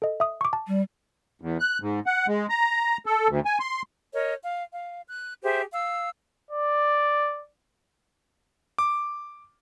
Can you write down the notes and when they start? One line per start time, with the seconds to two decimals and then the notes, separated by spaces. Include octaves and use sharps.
0.02 A4 D#5
0.20 E5 D#6
0.41 C#6 D6
0.53 A5
0.67 G3
1.42 E2
1.60 F#6
1.81 G#2
2.06 F#5
2.28 G#3
2.50 A#5
3.06 A4
3.29 D2
3.45 G#5
3.60 C6
4.14 A#4 C#5 D#5
4.42 F5
4.73 F5
5.08 F#6
5.43 G4 G#4 C5 E5
5.72 F5 E6
6.51 D5
8.78 D6